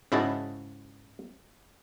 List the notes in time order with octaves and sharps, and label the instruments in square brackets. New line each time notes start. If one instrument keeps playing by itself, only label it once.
[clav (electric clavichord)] G#2 C#3 E4 F#4 D#5 A5